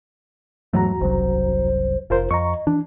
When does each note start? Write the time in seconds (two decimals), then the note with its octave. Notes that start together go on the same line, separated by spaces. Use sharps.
0.73 E2 G#2 F#3 A3 F#4 A#5
1.01 F#1 C2 F#3 C5
2.10 F1 F4 A#4 C5
2.31 F2 D#5 A#5 C#6
2.67 E3 D4